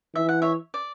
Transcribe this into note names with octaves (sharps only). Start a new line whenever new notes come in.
E3 E5
F#5
C#5 E5
D5